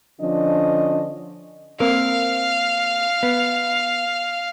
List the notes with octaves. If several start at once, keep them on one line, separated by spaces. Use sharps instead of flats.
D3 F3 C#4 D4 D#5
A#3 C4 A#4 F5
B3